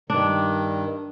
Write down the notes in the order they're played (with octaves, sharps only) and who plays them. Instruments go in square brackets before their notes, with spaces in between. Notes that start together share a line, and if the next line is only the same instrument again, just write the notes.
[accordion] G2 D#3 [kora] D4